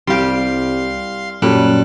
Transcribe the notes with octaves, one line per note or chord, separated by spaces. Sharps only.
C2 G3 G4 F5 C6
F#2 A#2 F#3 G3 A4 F#6